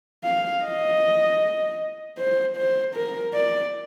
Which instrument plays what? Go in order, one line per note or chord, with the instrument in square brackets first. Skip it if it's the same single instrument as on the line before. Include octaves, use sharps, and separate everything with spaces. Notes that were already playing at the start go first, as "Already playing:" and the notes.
[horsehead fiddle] F5
D#5
C5
C5
A#4
D5